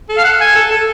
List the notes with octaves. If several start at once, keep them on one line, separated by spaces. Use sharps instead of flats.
A4
F5
F#5
G#5
A4
A4